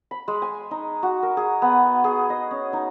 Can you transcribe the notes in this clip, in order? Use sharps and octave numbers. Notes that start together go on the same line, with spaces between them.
B5
G#3
G#5
D#4
F#4
A#4
G#4
B3
G#4
D#5
C#4
D#4